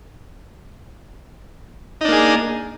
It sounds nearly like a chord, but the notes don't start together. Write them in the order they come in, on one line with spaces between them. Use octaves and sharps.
D#4 D4 A#3 G#4